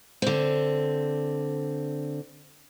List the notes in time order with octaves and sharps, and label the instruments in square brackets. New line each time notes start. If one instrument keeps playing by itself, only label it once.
[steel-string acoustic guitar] D3 C4